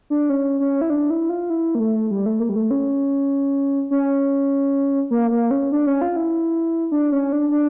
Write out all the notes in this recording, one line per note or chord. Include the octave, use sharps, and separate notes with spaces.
D4
C#4
C#4
E4
D4
E4
F4
E4
A#3
A3
G3
A3
A#3
G3
A3
C#4
C#4
A#3
A#3
C#4
D4
C#4
F4
E4
D4
C#4
D4
D4